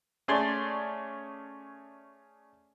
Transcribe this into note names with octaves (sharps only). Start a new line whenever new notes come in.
A3 C#4 G#4 C#5 D5 C6